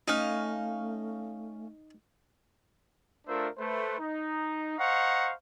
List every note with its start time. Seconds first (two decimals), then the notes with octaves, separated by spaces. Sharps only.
0.08 A3 C#4 D#4 F5
3.27 A3 D4 F4 A#4 C5 E5
3.58 A3 B4 C5
3.99 D#4
4.78 C5 D#5 F5 F#5 A#5 C#6